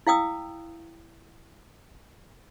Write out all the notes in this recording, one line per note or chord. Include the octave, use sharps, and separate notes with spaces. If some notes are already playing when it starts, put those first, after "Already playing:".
E4 F5 G5 D#6 E6